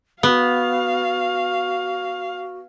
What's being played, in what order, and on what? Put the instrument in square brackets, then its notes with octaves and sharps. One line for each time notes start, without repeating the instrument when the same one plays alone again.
[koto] B3 [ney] F#4 [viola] F5